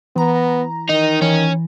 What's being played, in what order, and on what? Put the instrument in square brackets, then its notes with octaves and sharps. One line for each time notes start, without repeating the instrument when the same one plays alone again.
[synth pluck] E3 A#5 [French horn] B3
[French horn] D#3 [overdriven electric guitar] D#4
[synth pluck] E3 [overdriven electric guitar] C#4